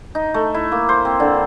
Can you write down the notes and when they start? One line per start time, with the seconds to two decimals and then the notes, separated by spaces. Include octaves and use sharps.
0.15 D#4
0.34 A3
0.54 E4
0.72 A#3
0.89 C5
1.05 C4
1.20 D3